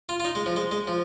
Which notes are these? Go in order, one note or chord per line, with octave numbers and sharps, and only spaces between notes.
F4
F4
D#4
G#3
F3
G#3
G#3
F3